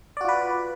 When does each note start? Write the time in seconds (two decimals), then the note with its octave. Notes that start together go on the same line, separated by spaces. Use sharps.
0.17 D5
0.21 F#4
0.25 F4
0.29 B4